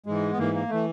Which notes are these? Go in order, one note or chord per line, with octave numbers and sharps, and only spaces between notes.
G#2 E3 G#3
B3
G#2 E3 A#3
A#3
E3 A3